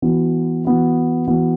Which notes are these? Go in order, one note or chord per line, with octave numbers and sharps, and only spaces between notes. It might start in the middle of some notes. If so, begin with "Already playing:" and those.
E3 B3 F#4
E3 B3 F#4
E3 B3 F#4